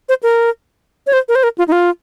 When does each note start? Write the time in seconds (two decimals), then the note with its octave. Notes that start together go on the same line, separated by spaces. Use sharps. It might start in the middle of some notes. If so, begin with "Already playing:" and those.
0.09 C5
0.23 A#4
1.07 C#5
1.13 C5
1.28 A#4
1.35 C5
1.43 A#4
1.58 F4
1.68 D#4
1.72 F4